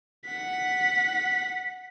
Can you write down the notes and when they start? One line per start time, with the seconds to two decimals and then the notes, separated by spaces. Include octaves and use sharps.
0.26 F#5 B6